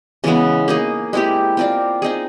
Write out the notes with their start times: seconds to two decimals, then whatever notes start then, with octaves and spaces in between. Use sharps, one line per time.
0.24 C#3 E3 G#3 B3
0.68 A#3 D#4 G#4
1.13 G#3 C4 E4 G4
1.57 C4 F4 A#4 D5
2.02 C4 D#4 G#4